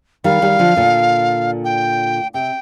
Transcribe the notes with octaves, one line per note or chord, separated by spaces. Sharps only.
D#3 G3 F5
D#3 G3
D3 F3
A#2 D3
G5
C3 G5